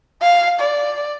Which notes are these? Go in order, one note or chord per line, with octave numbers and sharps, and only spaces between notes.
F5
D5